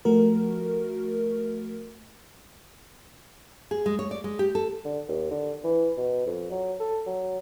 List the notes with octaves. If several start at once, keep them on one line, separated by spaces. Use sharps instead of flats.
F3 A3 F#4 A#4
G#4
G#3
C#5
D5
G#3
G4
A4
D3
D#2
D3
E3
B2
F2
F#3
A4
F#3